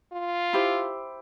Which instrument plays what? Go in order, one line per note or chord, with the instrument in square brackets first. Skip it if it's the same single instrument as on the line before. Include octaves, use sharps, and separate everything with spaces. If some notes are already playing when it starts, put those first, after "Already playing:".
[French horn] F4
[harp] E4 G4 C5